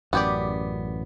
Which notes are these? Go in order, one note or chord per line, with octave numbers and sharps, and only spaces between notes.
A1 F#2 B3 G4 D5